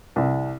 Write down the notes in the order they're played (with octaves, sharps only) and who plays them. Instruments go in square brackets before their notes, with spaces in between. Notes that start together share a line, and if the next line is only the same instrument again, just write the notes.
[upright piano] C2